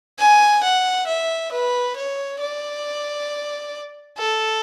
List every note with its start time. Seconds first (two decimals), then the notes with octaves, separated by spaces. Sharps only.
0.19 G#5
0.63 F#5
1.07 E5
1.52 B4
1.96 C#5
2.40 D5
4.18 A4